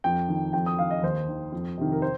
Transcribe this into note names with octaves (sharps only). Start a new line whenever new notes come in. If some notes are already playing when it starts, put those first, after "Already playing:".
F2 G5
D#3
F2 G5
D#6
D#3 F5
D#5
D#2 C5
D#3
F2
C3 D#3
A#4
C5